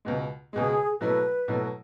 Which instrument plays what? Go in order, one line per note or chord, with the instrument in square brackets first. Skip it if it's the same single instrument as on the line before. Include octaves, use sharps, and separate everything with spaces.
[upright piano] C#2 B2 G#3
[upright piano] C#2 B2 G#3 [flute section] G#4
[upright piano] B2 F#3 A3 E4 [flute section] B4
[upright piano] B2 F#3 A3 E4